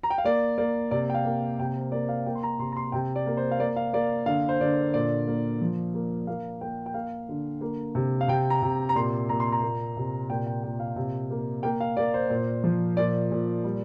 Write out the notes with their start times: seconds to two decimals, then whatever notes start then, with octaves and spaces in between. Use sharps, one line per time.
0.03 A#5
0.10 G5
0.18 F5
0.25 A#3 D5
0.58 A#3 D5
0.91 C3 D5
1.10 G5
1.14 F5
1.25 A#3
1.59 C3 G5
1.76 C5
1.92 A#3 D5
2.09 F5
2.26 A#3 G5
2.35 C6
2.43 A#5
2.59 C3 C6
2.72 A#5
2.76 C6
2.92 C3 G5
3.16 D5
3.26 A#3
3.37 C5
3.51 F5
3.59 A#3 D5
3.76 F5
3.93 A#3 D5
4.26 D3 F5
4.49 C5
4.61 D3 D5
4.94 A#2 D5
5.28 A#3
5.61 F3
5.94 A#3
6.27 A#3 F5
6.61 A#3 G5
6.86 G5
6.94 A#3 F5
7.29 D3
7.61 A#3
7.95 C3
8.21 F5
8.28 C3 G5
8.50 A#5
8.62 C3
8.89 A#5
8.95 A#2 C6
9.29 A#2 A#5
9.40 C6
9.52 A#5
9.62 A#3
9.97 C3
10.30 A#2 G5
10.47 G5
10.64 A#2 G5
10.80 F5
10.96 C3
11.31 A#3
11.63 A#3 G5
11.80 F5
11.97 A#3 D5
12.14 C5
12.30 A#2
12.64 F3
12.97 A#2 D5
13.31 A#2
13.64 G3